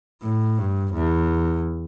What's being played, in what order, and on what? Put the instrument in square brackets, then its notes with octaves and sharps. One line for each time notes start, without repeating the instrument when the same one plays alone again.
[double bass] A2
G2
E2